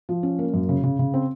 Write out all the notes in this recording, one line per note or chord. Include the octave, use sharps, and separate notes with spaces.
F3
C#4
A#3
F#2
C#3
C#3
C#3
C4